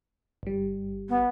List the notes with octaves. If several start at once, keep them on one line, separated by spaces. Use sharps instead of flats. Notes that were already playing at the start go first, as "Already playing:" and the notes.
G1 G3
B3